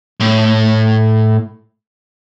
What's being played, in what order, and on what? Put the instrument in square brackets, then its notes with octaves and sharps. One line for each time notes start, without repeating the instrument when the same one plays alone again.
[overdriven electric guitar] A2